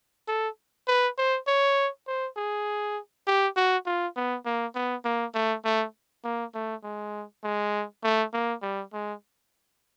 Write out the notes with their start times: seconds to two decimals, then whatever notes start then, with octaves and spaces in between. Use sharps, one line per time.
0.28 A4
0.88 B4
1.18 C5
1.47 C#5
2.07 C5
2.36 G#4
3.27 G4
3.56 F#4
3.86 F4
4.16 B3
4.45 A#3
4.75 B3
5.05 A#3
5.34 A3
5.64 A3
6.24 A#3
6.54 A3
6.83 G#3
7.43 G#3
8.04 A3
8.33 A#3
8.62 G3
8.93 G#3